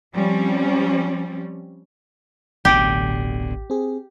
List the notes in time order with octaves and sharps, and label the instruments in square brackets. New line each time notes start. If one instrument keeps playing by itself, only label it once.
[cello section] F3 G3 C4 C#4
[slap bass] D1 B2 D3 [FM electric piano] A1 [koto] G4
[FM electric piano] C4 G#4